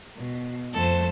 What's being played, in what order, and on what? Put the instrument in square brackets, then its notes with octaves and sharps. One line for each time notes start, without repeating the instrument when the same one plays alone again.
[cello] B2
[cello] F2 A3 [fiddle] A4 C5